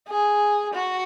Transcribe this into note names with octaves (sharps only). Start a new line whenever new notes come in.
G#4
F#4